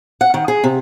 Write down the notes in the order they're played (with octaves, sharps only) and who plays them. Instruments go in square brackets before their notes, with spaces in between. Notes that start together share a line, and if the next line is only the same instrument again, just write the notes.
[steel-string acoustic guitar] F#5
D#3
G#4
C3